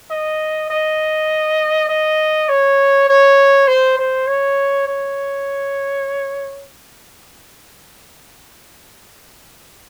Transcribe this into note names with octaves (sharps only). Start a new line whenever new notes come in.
D#5
D#5
D#5
C#5
C#5
C5
C5
C#5
C#5